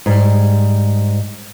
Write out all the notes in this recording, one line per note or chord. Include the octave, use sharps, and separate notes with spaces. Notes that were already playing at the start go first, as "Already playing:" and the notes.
G#2 G3